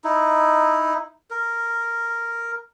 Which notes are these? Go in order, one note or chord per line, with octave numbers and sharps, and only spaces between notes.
D#4 E4
A#4